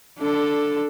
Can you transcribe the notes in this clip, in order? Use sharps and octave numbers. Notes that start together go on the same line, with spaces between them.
D4 A4